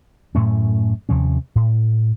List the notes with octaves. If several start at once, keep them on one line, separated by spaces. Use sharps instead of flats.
F#2 A2 A3 C#4
D#2 C3 F3 C#4
A2